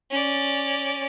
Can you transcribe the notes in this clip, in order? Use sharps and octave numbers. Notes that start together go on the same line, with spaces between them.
C#4 D5